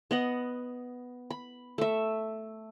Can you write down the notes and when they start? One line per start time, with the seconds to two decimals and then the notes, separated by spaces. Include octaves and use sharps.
0.11 B3 D#5 F#5
1.30 B5
1.78 A3 E5